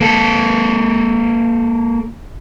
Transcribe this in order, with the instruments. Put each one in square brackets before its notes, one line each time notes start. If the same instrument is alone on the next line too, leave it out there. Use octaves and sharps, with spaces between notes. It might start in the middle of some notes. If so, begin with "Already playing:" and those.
[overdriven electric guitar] A#3 A4